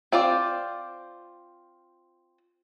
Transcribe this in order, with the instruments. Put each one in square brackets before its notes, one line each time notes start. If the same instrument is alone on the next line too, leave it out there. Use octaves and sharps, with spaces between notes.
[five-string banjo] C4 F4 C5 D5